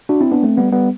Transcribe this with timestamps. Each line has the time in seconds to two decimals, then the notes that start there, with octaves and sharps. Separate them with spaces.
0.09 D4 F#4
0.21 C4 E4
0.32 B3 D4
0.43 A3 C4
0.57 G3 B3
0.72 G3 B3